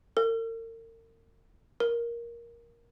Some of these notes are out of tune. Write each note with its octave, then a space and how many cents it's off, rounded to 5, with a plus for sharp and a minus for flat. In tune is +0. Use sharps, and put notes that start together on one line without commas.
A#4 -40
A#4 +10